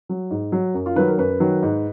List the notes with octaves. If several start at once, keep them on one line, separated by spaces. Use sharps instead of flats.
F#3
G#2
F#3
F#2
F4
D#3 F#3 B4
A#4
F#2 B4
D#3 F#3
G#2